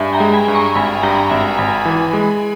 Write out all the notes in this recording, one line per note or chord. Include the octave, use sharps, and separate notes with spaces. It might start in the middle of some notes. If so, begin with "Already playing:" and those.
Already playing: G2 E5 G#5
G5 A#5
G#3
G#5 B5
G2
A#5 C#6
C#6
G#1 G#5 B5
G2 G5 A#5
G#1 E5 G#5
G#1 G#5 B5
E3
G#3